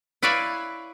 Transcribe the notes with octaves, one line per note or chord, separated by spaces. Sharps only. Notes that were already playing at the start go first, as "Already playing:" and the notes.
E4 B4 C#5 D5 E5 F5